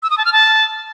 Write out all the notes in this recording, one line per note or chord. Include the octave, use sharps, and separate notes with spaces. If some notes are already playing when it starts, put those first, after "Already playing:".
E6
D#6
A5
F6
A5